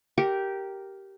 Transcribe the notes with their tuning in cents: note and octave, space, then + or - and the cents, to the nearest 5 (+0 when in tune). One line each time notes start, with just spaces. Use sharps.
G4 -10 A#4 +0